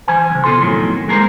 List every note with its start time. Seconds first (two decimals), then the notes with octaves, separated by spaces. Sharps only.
0.08 E3 C5 G#5
0.30 B1 C#3
0.44 B2 F4 A4 C6
0.61 F2 A2 D#3 F#3
1.08 G#3 A#3 A4 A#4 C5